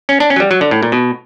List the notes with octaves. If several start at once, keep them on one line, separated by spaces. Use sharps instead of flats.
C#4
D4
C#4
F#3
G3
F#3
D3
A2
A#2
B2